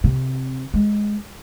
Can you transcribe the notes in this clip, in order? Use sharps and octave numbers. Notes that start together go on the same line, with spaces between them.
C3
G#3